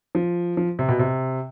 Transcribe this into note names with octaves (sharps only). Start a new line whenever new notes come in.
F3
F3
C3
B2
C3